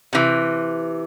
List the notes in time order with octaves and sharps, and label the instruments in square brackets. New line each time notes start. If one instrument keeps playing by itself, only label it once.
[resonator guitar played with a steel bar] C3 E3